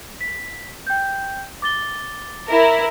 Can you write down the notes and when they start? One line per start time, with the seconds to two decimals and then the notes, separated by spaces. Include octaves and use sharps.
0.21 B6
0.87 G5 G6
1.62 D6 A6 G7
2.48 E4 A#4